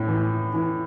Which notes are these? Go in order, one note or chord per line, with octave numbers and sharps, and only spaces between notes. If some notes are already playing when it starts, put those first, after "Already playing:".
Already playing: A2
E3
E3